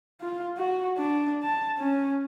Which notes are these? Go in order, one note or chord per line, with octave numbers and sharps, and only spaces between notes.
F4
F#4
D4
A5
C#4